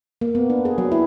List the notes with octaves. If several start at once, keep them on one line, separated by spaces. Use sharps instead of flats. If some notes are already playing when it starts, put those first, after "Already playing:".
A#3
B3
D4
G#4
F#3
E4